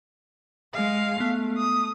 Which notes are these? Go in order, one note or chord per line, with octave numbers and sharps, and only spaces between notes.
G#3 F5
A3 B3
D#6